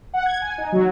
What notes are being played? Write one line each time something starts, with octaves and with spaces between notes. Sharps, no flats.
F#5
G#6
G#5
D#4
F#3